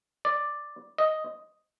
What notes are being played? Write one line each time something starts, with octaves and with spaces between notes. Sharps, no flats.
D5
D#5